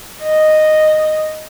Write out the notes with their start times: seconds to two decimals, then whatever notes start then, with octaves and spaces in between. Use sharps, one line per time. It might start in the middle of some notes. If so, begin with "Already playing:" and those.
0.22 D#5